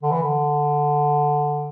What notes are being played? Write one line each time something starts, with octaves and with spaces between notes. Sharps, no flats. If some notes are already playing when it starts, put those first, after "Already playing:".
D3
E3
D3